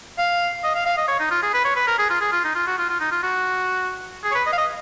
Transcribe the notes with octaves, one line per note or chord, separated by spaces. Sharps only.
F5
D#5
F5
F5
D#5
C#5
D#4
F4
G#4
B4
C#5
B4
A#4
G#4
F4
G#4
F4
D#4
F4
F#4
F4
F4
D#4
F4
F#4
G#4
C#5
B4
D#5
F5
D#5